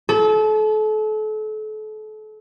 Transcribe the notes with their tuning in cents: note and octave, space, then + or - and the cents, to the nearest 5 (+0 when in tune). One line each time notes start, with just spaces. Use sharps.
A4 -35